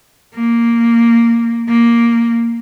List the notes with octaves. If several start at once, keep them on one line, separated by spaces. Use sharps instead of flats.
A#3
A#3